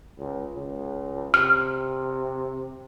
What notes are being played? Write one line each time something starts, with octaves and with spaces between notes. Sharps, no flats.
C#2
C#2
C3 F6